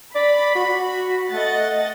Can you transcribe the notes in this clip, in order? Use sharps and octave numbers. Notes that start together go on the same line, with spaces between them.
D5 B5
F#4
A3 D#5 F#5 A6